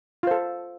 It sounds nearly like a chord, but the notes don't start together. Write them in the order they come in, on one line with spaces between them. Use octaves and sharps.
F4 C5 A4